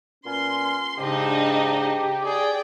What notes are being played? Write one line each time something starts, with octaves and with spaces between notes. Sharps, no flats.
A#2 B3 C#4 C6
G#2 C#3 D4 D#4 G4 D#5
G#4 D5 G5